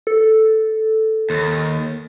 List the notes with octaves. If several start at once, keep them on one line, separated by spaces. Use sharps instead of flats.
A4
D#2